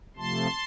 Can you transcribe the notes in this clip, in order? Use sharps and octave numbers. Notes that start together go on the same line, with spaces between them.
C3 F3 A3 A5 C6